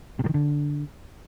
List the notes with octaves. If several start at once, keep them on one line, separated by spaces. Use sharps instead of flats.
C3
A2
D#3
D3